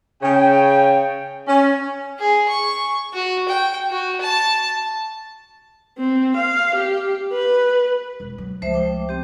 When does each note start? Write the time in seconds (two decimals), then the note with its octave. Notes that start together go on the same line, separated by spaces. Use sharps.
0.22 C#3 C#5 G5
1.48 C#4
2.19 G#4
2.48 C#6
3.14 F#4
3.48 G5
3.90 F#4
4.21 A5
5.98 C4
6.37 F5
6.75 G4
7.32 B4
8.20 E1
8.38 F#3
8.62 C#2 F3 A3 C5 E5
8.74 G5 D6
9.09 C4 G4